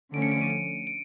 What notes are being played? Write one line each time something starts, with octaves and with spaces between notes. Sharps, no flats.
D3 F3 A3 C#4 D7
C#7
D7
D#7
D7
D7